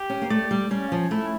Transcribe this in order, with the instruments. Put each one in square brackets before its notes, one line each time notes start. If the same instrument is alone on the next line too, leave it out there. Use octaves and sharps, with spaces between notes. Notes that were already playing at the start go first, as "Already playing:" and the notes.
Already playing: [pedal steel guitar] G4
[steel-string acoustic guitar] C#4
A#3
[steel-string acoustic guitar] A3 [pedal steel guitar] D5
[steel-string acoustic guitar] G3
[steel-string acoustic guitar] G3 [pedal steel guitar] C#4
[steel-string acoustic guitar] F3
[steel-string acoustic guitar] A3 [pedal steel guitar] E4